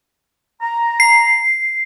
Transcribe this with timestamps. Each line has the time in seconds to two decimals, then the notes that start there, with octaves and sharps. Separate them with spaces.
0.62 A#5
1.00 C7